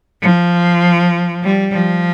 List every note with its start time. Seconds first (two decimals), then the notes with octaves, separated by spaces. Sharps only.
0.22 F3
1.43 G3
1.73 F3